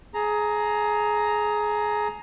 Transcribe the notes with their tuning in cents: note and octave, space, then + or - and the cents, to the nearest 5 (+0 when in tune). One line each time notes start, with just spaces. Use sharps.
G#4 +20 A#5 +0